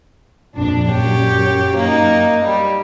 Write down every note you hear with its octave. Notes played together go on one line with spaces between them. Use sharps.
A#1 F2 D4
F#2 G4 C#5
A#3 D#4
G3